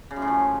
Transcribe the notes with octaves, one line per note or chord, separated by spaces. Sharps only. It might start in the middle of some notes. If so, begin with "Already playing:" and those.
C#3
F#2
A2
F3